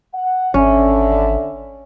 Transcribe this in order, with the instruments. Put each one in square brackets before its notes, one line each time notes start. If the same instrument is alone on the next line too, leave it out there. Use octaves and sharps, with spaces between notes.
[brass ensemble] F#5
[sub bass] G#1 [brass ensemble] D3 D5 E5 [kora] C#4